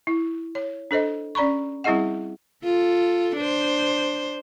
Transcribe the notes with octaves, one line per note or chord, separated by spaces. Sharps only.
E4
C#5
D4 A4 C5 D#5
C#4 D5 A#5 B5 C#6
G3 C4 E4 G#4 D#5 F#5
F4 A4
D4 C5